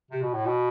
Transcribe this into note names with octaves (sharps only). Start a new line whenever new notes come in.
C3
B2
A2
B2